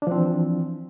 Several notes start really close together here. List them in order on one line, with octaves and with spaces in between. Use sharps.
D4 F3 C4 E3